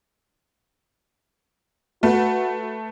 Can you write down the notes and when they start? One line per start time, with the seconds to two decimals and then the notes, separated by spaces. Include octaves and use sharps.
2.03 A3 F#4 B4